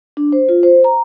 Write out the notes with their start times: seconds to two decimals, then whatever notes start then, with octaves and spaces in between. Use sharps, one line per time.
0.17 D4
0.32 C5
0.49 F4
0.63 C5
0.84 A#5